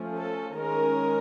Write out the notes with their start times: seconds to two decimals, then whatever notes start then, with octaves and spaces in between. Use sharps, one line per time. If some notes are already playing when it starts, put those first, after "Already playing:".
Already playing: F3 A3 C#4
0.16 A4
0.57 D#3 G#3 C#4 A#4